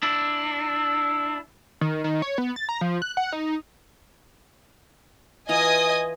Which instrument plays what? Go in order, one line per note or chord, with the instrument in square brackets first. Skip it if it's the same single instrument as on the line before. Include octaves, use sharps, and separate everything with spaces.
[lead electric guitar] D4 E4
[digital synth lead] D#3
D#3
C#5
B3
A6
A#5
F3
F#6
F#5
D#4
[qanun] E3 F4 A#5 [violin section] D#5 G#5 D#6